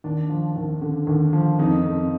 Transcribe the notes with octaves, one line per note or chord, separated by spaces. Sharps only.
D#2 D4
F3
D#2
D3
D#2
F3
F2 D#4
F2